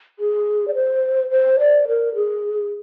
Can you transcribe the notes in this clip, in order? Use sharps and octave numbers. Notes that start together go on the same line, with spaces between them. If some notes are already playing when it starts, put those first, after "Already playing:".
G#4
D5
C5
C5
D5
A#4
G#4